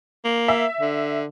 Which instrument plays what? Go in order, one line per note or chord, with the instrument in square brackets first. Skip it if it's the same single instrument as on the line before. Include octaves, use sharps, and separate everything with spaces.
[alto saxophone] A#3
[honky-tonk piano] E5
[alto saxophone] D3